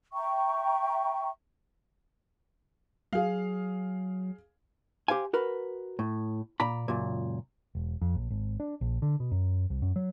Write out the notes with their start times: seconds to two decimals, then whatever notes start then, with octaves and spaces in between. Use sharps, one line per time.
0.12 E5 G5 A#5 C#6
3.13 F#3 G#4 F5
5.08 G4 C5 F5 G#5
5.33 F#4 A#4 B4
5.99 A2
6.60 A#2 D5 A#5 B5
6.88 C#2 F#2 A#2
7.75 E1
8.02 F2
8.15 A#1
8.30 G#1
8.60 D4
8.81 A#1
9.02 D3
9.20 B2
9.32 F#2
9.70 C2
9.82 F#2
9.96 F#3